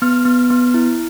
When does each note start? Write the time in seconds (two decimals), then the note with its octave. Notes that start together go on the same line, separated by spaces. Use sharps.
0.02 B3 F6
0.25 B3
0.50 B3
0.74 E4